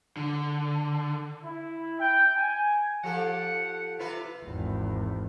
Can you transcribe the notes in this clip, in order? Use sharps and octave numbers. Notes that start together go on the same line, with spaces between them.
D3
E4
G5
G#5
F3 G4 A4 F#5
C3 F4 B4 E5
G#1 E2